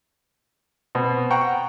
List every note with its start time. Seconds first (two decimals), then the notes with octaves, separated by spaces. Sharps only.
0.95 B2 C4
1.31 F#5 G5 A#5 C#6